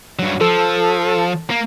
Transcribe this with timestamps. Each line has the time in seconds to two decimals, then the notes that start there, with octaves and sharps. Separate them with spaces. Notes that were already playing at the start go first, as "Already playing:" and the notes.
0.19 G2 F#3
0.41 F3 A4
1.50 A#3